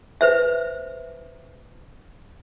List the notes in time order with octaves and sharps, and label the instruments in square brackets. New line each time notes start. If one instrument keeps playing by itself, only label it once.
[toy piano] B4 C5 E5